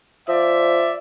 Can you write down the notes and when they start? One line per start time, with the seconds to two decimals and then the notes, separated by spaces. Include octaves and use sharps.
0.28 F3 D5 E5